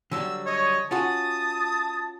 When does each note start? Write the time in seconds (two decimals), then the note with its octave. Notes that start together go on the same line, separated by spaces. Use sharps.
0.11 D3 F#3 G3 E6
0.46 C#5 D#5
0.91 C#4 F4 F#4 A5 D#6